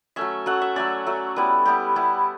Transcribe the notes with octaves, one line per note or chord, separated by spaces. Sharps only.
F#3 A3 C#4 E5
F#3 A3 C#4 F#5
E5
F#3 A3 C#4 D5
F#3 A3 C#4
G3 B3 E4 B4
G3 B3 E4 G4
G3 B3 E4